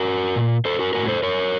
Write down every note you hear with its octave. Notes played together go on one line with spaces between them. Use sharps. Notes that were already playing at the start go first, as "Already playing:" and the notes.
Already playing: F#4 A#4
A#2
A4 C5
F#4 A#4
A2 F#4 A#4
A4 C5
A#4 C#5